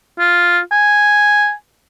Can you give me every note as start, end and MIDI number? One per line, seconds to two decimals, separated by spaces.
0.19 0.60 65
0.72 1.52 80